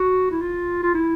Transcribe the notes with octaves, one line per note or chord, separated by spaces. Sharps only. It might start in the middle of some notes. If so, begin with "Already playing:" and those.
Already playing: F#4
E4
F4
F4
E4